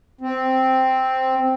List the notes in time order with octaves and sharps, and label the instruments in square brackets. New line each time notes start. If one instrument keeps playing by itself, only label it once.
[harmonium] C4